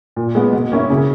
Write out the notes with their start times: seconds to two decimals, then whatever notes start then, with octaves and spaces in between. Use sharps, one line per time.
0.16 A#2
0.35 G#3 B3
0.53 B2
0.72 A#3 C#4 E4
0.90 C#3